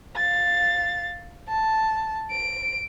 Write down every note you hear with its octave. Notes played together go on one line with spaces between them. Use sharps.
F5 A6
A5
D7